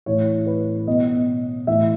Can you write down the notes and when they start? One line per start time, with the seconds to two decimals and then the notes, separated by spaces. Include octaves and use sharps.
0.06 A2 E3 C#5
0.47 B4
0.87 B2 D#5
1.67 A2 E3 E5